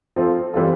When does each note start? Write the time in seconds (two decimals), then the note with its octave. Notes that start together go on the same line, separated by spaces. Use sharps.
0.16 F3 C4 F4 A4
0.53 E3 G3 C4 F4 A4